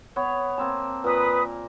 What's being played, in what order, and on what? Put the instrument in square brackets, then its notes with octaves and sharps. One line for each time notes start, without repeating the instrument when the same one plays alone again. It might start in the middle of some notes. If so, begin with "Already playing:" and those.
[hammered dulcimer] B3 C#5
A#3 C4 A5
[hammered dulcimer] A#2 A#4 [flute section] B4 D#6